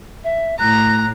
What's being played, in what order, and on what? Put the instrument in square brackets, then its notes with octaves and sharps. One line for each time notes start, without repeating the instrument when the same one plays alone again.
[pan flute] E5
[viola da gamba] A2 [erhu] A#5 [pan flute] F#6